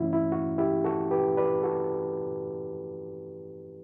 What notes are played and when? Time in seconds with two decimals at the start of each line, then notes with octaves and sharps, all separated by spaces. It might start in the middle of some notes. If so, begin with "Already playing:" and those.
Already playing: G2 E3 A3 C#4 E4 F#4
0.13 E4
0.32 F#4
0.58 E4 G4
0.84 F#4 A4
1.11 G4 B4
1.37 B4 D5
1.63 F#4 A4